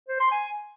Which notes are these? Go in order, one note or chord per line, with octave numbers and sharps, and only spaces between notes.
C5
C6
G#5